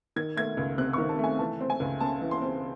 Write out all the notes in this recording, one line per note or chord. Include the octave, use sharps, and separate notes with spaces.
D#3 G#6
A3 G#6
C#2
C3 F#6
D#3 C#6
A5
A3 G#5
E3 A5
C4
G#5
C#2
C#3 A5
E3
C6
C4